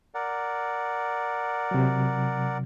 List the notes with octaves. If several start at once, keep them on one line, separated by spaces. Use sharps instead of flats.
A#4 D5 F#5
C3 F#3